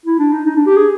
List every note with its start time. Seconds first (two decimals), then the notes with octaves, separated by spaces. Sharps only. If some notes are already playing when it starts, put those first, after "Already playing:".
0.06 E4
0.19 D4
0.33 D#4
0.46 D#4
0.56 D4
0.67 G4
0.77 G#4